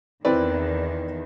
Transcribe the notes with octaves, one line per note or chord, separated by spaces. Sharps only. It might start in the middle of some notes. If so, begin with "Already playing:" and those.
E2 D#3 C4 E4 B4 D5